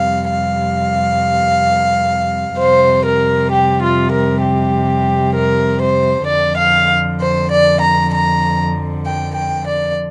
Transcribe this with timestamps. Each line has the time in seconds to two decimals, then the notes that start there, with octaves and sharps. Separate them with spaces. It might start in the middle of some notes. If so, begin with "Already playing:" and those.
Already playing: F2 C3 G3 F5
0.29 F5
2.59 F2 C3 G3 C5
3.06 A#4
3.52 G4
3.82 F4
4.12 A#4
4.43 G4
5.35 A#4
5.81 C5
6.27 F2 D3 F3 D5
6.58 F5
7.19 C5
7.50 D5
7.80 A#5
8.11 A#5
9.04 G5
9.33 G5
9.65 D5